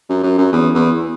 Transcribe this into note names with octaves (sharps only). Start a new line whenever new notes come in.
F#2
F#2
F#2
E2
E2